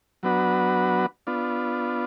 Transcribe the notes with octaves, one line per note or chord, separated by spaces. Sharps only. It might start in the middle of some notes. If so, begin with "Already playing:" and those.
F#3 B3 D4 F#4 B4
B3 D4 F4